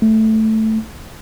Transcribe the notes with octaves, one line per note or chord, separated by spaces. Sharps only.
A3